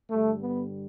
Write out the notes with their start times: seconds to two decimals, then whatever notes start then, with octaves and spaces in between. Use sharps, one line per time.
0.10 G2 D3 G3 A3
0.41 B3